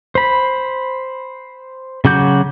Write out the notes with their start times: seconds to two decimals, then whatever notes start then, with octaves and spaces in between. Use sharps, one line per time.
0.15 C5 B5
2.05 C#3 F#3 F#4 D6 G6